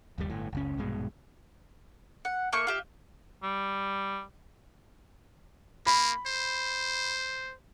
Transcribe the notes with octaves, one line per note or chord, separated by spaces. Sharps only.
F#1 D#2 G3
G1 A2
F#1 C#2 C#4
A#1 G2 B2 G#3
F#5
A3 A#3 C#6
F4 G4 E5
G3
A#3 B5
C5